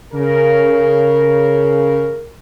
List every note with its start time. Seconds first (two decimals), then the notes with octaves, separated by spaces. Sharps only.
0.13 C#3 A#4